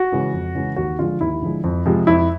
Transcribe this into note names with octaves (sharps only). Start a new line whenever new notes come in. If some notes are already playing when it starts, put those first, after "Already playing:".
Already playing: F#4
C#3 E3 G#3
F2
C#3 E3 G#3
D#2 F#4
D3 F3 G#3 F4
D#2 E4
D3 F3 G#3
F2
C3 F3 G#3
F2 E4